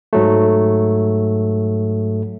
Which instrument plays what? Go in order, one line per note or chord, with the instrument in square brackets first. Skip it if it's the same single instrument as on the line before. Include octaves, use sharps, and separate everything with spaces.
[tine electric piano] G#2 F#3 A3